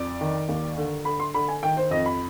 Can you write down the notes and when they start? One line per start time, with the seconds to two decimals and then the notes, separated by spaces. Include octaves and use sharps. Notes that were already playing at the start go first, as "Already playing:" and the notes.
Already playing: F2 D5
0.21 D#3
0.49 D#2
0.77 D3
1.05 D3 B5
1.20 C6
1.34 D3 B5
1.48 G#5
1.63 D#3 G5
1.77 C5
1.91 F2 D#5
2.06 B5